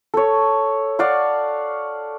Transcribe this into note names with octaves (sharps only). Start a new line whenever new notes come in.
A4 C#5
D5 F5 F#5 C#6